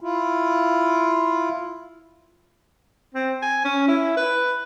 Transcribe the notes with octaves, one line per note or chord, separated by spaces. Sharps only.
E4 F4
C4
G#5
C#4
E4
B4